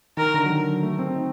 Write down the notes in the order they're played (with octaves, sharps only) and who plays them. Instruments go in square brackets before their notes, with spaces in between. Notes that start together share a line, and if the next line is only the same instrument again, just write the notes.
[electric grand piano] D#3 [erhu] A#4
[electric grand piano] D3
F#3
D#3
A3
C4
D#4